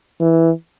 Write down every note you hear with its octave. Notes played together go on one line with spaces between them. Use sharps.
E3